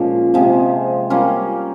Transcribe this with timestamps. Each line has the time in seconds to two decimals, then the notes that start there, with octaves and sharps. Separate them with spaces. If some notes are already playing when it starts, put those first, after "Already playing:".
Already playing: A#2 F3 G#3 C#4
0.34 C3 F3 G#3
1.10 G3 A#3 C#4 F4